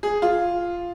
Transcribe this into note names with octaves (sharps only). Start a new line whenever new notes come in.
G#4
F4